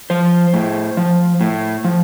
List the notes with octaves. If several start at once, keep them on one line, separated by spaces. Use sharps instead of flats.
F3 C5
A2
F3
A2
F3